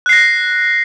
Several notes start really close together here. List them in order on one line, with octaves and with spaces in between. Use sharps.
F#6 C7 A#6